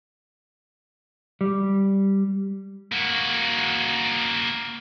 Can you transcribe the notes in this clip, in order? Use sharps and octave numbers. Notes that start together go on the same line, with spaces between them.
G3
A#3 F#4